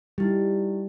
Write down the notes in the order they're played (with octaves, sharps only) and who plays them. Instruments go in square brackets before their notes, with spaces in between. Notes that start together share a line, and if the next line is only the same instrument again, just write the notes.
[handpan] G3 [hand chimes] D#4 E4 G4